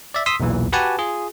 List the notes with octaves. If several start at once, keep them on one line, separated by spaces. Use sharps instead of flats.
D5 E5
C6 D#6 E6 B6
B1 E2 A#2 E3
F#4 G4 B4 F#5 G#5 A5
F4 G#4